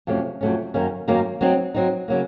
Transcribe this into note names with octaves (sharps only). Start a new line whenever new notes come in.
F2 C3 F#3 A3 C#4
F2 C3 F#3 A3 C#4
F#2 D#3 A#3 C#4
F#2 D#3 A#3 C#4
F#3 C4 D#4
F#3 C4 D#4
C#3 F#3 A#3